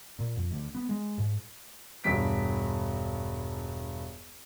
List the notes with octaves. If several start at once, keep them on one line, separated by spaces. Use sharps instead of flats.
A#2
F2
D2
B3
G#3
G#2
E1 G2 B6 D7